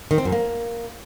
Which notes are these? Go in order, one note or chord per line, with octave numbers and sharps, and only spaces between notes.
D#3
C4
F#2
A#3